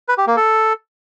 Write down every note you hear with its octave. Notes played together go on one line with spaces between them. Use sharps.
B4
G4
A#3
A4